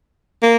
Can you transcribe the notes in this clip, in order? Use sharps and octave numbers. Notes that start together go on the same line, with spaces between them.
A#3